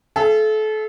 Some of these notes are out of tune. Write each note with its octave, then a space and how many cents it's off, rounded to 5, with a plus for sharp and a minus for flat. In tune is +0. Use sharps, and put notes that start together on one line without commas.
A4 -30 E5 +40